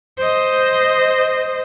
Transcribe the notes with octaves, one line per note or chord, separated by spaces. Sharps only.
C5 D#5